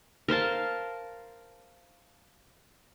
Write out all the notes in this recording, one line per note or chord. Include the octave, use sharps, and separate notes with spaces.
A#4 C5 F5 A5